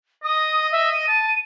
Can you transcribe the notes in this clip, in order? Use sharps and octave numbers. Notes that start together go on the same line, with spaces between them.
D#5 D#6
E5
D#7
A5